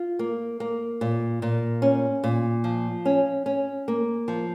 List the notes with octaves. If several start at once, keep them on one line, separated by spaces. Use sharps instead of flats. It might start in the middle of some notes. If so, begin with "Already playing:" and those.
Already playing: F4
A#3
A#3
A#2
A#2
C#4
A#2
F3
C#4
C#4
A#3
F3